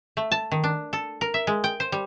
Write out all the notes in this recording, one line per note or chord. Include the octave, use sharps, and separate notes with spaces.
A3
A5
D#3
D4
A4
A#4
E5
G#3
G5
C5
G3